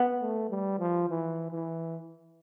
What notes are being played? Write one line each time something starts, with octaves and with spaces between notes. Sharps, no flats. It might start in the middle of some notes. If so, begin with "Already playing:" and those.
Already playing: B3
A3
G3
F3
E3
E3